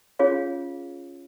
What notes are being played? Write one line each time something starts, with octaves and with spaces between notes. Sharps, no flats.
C#4 F4 G#4 C#5 F5